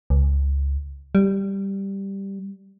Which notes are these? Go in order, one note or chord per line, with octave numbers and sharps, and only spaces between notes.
C#2
G3